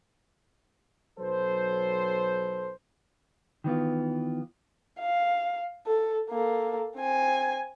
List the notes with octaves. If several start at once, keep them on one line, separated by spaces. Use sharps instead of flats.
B1 F#3 A4 B4 C5
D#3 E3 B3 F4
F5
A4
A#3 A4
C4 G#5